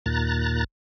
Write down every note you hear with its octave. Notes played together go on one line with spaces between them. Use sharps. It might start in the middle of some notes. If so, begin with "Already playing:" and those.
D#2 A#2 A#5 F#6 A6